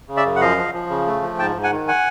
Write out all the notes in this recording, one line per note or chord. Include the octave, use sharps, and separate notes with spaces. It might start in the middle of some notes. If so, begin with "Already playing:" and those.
C#3
D5 E5
F#2
F#5
F3 D#5 F5
F3
F3
C#3
A3
F3
G#2 G5 A5
G#2
F#5 G#5
D#3
F#5 G#5